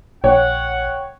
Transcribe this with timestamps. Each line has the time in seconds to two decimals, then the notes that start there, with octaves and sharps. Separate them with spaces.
0.24 A#1 C#5 F#5 G5